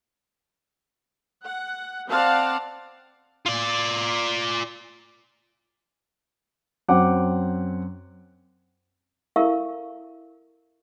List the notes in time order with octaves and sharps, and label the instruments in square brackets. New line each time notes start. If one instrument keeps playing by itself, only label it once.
[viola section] F#5
C4 D5 F5 F#5 A5
[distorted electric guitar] F4 D5
[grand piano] F#2 C4 F#5 G5 D6
[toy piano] E4 A4 A#4 E5 F5 C#6